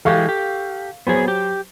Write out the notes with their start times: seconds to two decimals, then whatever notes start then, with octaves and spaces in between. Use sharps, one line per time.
0.05 E3 G#3 G4 A4 F5 C#6
0.29 G4
1.07 F#3 B3 G#4 C5
1.28 G4